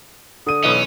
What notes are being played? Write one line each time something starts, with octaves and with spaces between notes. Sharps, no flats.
D3 D#6 D#7
B1 E3 C#4 D#5